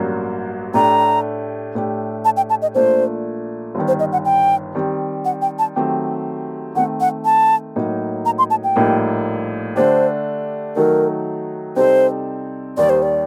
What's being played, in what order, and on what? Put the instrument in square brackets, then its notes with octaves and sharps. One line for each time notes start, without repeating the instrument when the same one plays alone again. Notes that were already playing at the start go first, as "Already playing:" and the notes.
Already playing: [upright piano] A1 G2 F#3 A#3
[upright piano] A2 A3 D4 G4 [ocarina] A#5
[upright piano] A2 A3 D4 G4
[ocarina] A5
G5
A5
D#5
[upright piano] A#1 A#2 A3 D4 [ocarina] C5
[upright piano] G1 G2 D#3
[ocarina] C5
D#5
F#5
G5
[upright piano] D#3 G3 C4
[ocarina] F#5
G5
A5
[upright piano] D#3 F#3 A3 C4 G4
[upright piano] D#3 A3 C4 [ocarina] F#5
[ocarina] F#5
A5
[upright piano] A2 F#3 A#3 D#4
[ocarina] A#5
C6
A5
G5
[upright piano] A#1 A2 G3 A#3 D#4
[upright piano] D3 A3 D4 G4 [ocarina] C5
[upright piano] D#3 F#3 A3 D#4 A4 [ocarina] A#4
[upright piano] C3 G3 C4 D#4 A4 [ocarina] C5
[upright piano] D#2 D#3 G3 [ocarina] D5
[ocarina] C5
D5